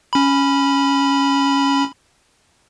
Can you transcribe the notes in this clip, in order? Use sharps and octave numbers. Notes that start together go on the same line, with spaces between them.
C#4 B5